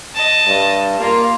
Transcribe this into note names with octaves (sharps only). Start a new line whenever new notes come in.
D#5 A5
G2
A#3 F4